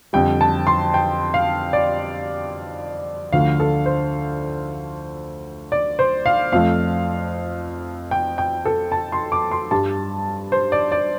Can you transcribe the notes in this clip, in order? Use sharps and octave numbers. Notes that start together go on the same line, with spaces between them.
F2 D3 G3 G5
A5
C6
G5
F5
D5
D2 D3 F3 A3 F5
A4
C5
D5
C5
F5
F2 F3 A3 F5
G5
G5
A4
A5
C6
D6
C6
G2 G3 A5
C5
D5
D5